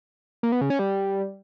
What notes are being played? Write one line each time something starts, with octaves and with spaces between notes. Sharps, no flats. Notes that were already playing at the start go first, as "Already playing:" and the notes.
A#3
B3
C#3
C#4
G3